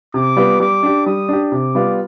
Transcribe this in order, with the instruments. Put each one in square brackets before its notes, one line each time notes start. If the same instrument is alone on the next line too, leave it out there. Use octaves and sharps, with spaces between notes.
[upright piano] C3 [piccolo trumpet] D6
[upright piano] G3 B3 F4
[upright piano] G3 [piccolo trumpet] D6
[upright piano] D4 G4
[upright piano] G3 [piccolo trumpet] D#6
[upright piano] D4 G4
[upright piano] C3 [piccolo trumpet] D6
[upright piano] G3 B3 F4